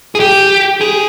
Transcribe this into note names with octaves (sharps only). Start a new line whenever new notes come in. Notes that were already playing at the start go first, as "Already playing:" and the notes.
G#4
G4
G#4